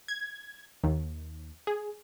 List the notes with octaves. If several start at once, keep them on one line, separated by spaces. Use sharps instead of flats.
G#6
D#2
G#4